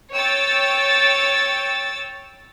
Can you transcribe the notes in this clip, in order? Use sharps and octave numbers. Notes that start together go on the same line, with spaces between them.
C#5 G5 E6 A6